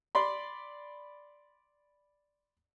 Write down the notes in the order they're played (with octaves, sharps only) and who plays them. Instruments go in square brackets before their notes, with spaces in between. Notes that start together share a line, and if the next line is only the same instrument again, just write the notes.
[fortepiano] D5 B5 C6